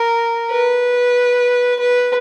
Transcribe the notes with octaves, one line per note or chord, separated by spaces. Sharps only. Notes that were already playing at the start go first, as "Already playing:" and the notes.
Already playing: A#4
B4
B4